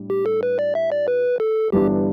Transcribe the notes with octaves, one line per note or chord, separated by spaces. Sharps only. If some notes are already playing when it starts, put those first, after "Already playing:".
Already playing: A2 G3 D4
G4
A4
B4
D5
E5
D5
B4
A4
G1 G2 E3 G3 D4 G4